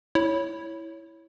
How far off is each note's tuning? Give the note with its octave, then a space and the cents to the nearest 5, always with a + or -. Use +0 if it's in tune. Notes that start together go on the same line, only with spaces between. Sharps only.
E4 +0 C#5 +5